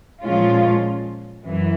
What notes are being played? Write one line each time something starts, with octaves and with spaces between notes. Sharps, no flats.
A#2 F3 G#3 C#4 F4
F#2 E3